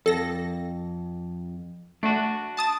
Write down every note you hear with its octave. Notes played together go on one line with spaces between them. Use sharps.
F2 A4 A#6
A3 D4 F#4
A5 D#6 A6